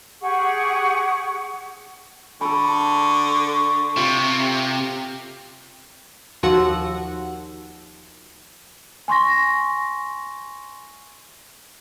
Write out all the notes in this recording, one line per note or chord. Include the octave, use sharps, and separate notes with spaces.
G4 G#4 F#5 C#6
D3 A4 B5 C#6
C3 F4
D#2 F3 F#4 F#5 E6
G#5 C6 C#6 A#6